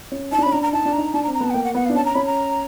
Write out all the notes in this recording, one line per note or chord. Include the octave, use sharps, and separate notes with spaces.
C#4
D#4 A5
D4
C#4 B5
D4 A#5
A#5
D#4 A5
D4
A#5
D#4
D4 A5
A#5
C4
A#5
B3 A5
F#5
A#3 G5
F#5
B3 F#5
F5
D4
C#4 A5
A#5
C#4 B5
A#5